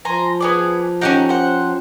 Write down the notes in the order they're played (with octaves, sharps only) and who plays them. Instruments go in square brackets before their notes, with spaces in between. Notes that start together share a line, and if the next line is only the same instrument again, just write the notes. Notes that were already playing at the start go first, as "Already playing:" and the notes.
[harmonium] F3 [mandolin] G#5 A#5 C6
[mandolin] B3 G#4 D5
[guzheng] C#4 G4 G5 [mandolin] D#4 F#5
[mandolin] C5 F#5